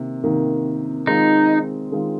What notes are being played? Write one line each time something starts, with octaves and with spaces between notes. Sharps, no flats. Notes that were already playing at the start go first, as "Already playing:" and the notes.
Already playing: C3 D#3 A#3
C3 D#3 A#3
D#3 G#3 C4 D#4 F4
D#3 G#3 C4 F4